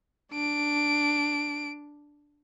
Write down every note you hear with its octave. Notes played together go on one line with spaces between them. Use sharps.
D4 D7